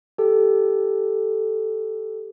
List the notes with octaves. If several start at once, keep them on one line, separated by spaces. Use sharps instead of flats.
G4 A4